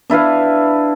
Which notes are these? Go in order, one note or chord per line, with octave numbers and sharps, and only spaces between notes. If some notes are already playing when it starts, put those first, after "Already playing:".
D4 E4 B4 F5